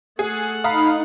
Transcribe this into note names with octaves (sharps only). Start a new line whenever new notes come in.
A3 G#4 F#5
D#4 F5 A#5 B5 D#6